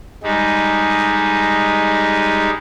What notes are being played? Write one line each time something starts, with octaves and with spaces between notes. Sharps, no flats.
G3 G#3 D#4